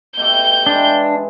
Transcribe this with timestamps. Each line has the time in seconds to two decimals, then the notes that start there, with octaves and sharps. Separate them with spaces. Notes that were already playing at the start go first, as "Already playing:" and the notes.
0.17 B2 A3 G4 G6 G7
0.66 E3 G#3 D4 G5